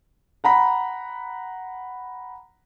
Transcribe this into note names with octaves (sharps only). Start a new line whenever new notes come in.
F#5 A#5 B5 B6